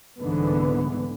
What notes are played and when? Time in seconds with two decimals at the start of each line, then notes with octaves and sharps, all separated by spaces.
0.19 C2 G#2 D3 E3 B3